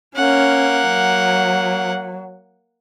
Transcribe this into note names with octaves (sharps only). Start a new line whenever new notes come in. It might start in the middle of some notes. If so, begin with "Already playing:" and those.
A#3 C#4 F#5
F#3